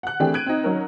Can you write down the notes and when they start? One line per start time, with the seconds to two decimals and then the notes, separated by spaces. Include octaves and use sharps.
0.03 F#5 F#6
0.20 E3 A3 C4 D4 G4 G#4
0.34 F#6 G#6 D7 D#7
0.46 C4 D#4
0.64 F#3 C#4 D#4 A#4